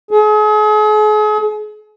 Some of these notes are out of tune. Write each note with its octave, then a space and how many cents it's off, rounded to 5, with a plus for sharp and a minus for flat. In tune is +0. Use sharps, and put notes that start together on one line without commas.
G#4 +40